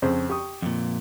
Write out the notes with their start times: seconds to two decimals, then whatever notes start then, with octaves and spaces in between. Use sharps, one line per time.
0.02 F2 C#3 C4
0.29 G4 C#6 D#6
0.62 F2 A#2